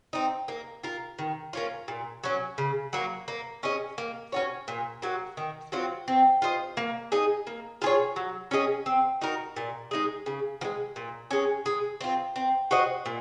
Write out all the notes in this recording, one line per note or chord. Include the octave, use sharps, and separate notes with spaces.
C4 D#4
A#3
F4 A#4
D#3
A#3 C#4 F4
A#2
F#3 C#4
C#3
F#3 A#3
A#3
C#4 G#4 D#5
A#3
C#4 F#4 C#5
A#2
F#3 A#3
D#3
F#3 C4 F4
C4
F4 C5 D#5
A#3
D#4 G#4 D#5
A#3
F4 G#4 C#5
F#3
C#4 G#4 D#5
C4
D#4 F#4 A#4
A#2
G#3 D#4 G#4
C#3
F3
G#3
A#2
G#3 C#4
G#3
C4 F4
C4
F#4 C5 D#5
A#2